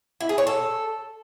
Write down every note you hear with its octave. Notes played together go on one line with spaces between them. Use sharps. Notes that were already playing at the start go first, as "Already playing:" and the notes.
E4
G#4
C#5
A4